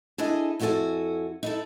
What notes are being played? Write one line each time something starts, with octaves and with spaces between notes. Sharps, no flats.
D4 E4 G#4 A4 D#5 G#5
F2 E4 F#4 G#4 A4 G#5
D#4 E4 A4